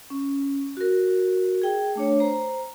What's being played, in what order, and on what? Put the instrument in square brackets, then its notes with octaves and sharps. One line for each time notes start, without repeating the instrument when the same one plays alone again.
[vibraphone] C#4
F#4 A#4
G#4 G5
A3 D4 C#5
C5 A#5